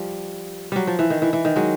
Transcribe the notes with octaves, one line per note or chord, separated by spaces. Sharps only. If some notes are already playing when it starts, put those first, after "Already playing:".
Already playing: F3 G3
F#3 G3
F3
E3
D#3
E3
E3
D#3
F#3 G#3